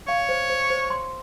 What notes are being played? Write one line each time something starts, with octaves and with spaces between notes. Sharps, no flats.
C#5 F5
C5
C5
C5
C6